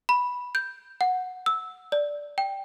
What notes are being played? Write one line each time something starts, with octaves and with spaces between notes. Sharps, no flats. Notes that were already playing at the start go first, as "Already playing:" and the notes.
B5
G6
F#5
E6
D5
G5